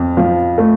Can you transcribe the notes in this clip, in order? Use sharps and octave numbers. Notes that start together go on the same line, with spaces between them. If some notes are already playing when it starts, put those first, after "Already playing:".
Already playing: F2
F3
A3